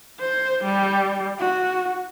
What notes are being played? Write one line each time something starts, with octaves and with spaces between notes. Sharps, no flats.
C5
G3
F#4